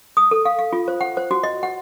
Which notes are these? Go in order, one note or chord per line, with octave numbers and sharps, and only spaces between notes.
D#6
A4
F5
F5
F4
C5
F#5
C5
F#4
D#5
F#5